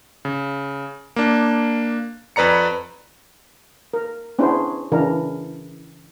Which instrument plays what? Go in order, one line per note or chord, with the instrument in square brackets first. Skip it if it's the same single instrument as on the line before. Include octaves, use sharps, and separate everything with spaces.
[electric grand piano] C#3
A#3 D4
F2 B4 D5 A#5 C#7
[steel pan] A#4
B3 C#4 D4 E4 G#4 C5
C#3 E3 D4 A#4